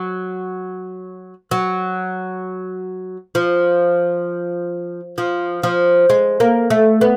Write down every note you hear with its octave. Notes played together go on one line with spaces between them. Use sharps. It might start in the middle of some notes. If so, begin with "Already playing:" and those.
Already playing: F#3
F#3
F3
F3
F3
G#3
A#3
A3
B3